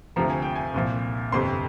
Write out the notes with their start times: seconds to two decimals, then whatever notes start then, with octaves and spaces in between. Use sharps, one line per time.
0.16 D2 C3 F3 A#5
0.30 G#5
0.42 G5
0.56 G#5
0.74 C2 A#2 F3
1.32 G1 F2 C3 C6